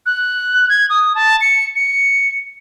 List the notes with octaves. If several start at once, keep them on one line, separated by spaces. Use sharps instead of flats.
F#6
G#6
D#6
A5
C#7
C#7